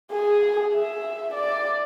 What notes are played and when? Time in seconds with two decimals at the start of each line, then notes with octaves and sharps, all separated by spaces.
0.12 G#4
0.75 E5
1.34 D5